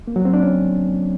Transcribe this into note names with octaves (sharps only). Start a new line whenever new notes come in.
A#3
F#3
C4
D4
C#4